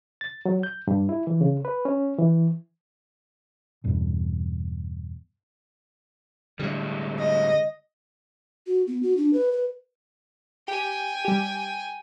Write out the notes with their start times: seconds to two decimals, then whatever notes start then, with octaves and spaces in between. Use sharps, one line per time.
0.21 A6
0.45 F#3
0.63 G6
0.87 G2
1.09 E4
1.27 E3
1.41 C#3
1.65 B4
1.85 C#4
2.18 E3
3.84 E2 G2 B2
6.59 A2 D3 G3 G#3
7.19 D#5
8.67 F#4
8.87 B3
9.03 F#4
9.17 D4
9.33 B4
9.52 B4
10.68 G4 G5 G#5
11.25 G3 G4